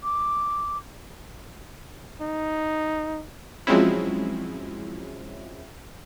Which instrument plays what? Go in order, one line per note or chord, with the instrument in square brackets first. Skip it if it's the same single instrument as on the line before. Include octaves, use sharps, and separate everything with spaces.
[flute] D6
[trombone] D#4
[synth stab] F3 F#3 G#3 C4 C#4 E4